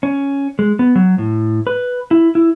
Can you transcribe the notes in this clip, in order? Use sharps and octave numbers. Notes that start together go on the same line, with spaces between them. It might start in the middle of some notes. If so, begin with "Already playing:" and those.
C#4
G#3
B3
F#3
A2
B4
E4
E4